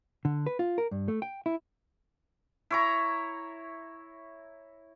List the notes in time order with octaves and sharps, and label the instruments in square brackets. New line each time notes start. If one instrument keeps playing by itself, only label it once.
[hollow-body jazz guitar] D3
B4
F4
A#4
G2
A3
G5
E4
[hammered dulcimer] E4 C#5 A#5